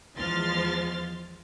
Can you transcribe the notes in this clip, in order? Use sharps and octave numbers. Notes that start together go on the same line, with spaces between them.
E2 F3 G#3 C6 F6 A6